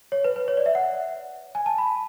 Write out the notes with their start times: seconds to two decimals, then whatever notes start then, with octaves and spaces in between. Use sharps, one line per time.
0.12 C#5
0.24 B4
0.36 B4
0.48 C#5
0.57 D5
0.66 E5
0.75 F#5
1.55 G#5
1.66 A5
1.78 B5